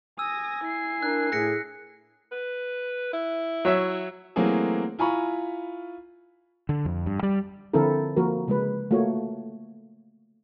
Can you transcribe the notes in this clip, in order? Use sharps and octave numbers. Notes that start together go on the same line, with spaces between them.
G#5 D#6 E6 A#6
E4 C7
D4 A#4 F#6
A2 G#4 F#6 A#6 C#7
B4
E4
F#3 C#5 E5
E3 F#3 A3 A#3 C4 G#4
E4 F4 G#5 A#5 B5 C#6
D3
F2
G2
G3
D3 F3 C4 E4 A4 A#4
F3 A#3 F#4 A#4
C#3 G#3 B4
A3 A#3 F4 F#4 C#5